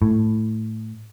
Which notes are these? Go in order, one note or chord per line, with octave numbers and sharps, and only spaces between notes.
A2